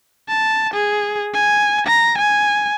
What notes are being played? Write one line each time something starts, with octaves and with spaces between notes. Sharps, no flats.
A5
G#4
G#5
A#5
G#5